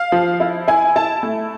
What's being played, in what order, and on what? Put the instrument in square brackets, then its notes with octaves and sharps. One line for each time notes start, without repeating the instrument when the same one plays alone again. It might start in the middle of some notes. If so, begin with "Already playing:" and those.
Already playing: [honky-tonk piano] F5
F3
E4
E4 G#5
E4 A5
A3